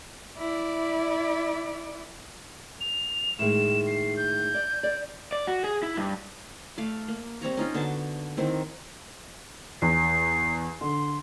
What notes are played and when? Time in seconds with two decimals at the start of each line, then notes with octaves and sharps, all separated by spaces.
0.38 E4 D5
2.81 F7
3.39 A2 D#3 G#3 E7
3.87 C7
4.17 G6
4.54 D5
4.83 D5
5.32 D5
5.47 F#4
5.64 G#4
5.83 E4
5.97 G2
6.77 A3 D5 F5
7.08 A#3
7.42 G3 C4 C#5 A#5
7.57 C#4 D#4 F4
7.74 D3 B3 F#4 A5
8.37 D#3 C4 E4
9.82 E2 C7
10.81 D3 C6